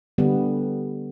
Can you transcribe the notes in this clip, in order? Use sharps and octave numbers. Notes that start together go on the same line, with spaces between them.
D3 G3 B3